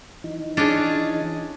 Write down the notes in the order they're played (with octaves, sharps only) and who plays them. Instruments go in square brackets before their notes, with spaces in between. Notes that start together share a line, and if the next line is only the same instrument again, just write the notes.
[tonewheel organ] E3 D#4
[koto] C#4 D4 F4 [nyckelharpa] G#4